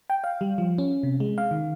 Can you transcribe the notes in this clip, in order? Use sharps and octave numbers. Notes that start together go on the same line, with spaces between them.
G5
F5
G3
F3
C#4
C3
G#3
F5
D#3